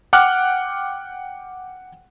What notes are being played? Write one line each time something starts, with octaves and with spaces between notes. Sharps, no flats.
F#5 G5 D6 F6 F#6